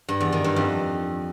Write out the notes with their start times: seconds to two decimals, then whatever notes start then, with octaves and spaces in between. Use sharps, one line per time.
0.08 G2
0.20 E2
0.32 D#3
0.44 G2
0.56 F2